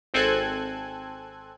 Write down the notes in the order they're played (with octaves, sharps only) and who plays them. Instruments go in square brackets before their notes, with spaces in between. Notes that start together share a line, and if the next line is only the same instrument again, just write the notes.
[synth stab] G#1 C4 A4 G#5 F#6 G#6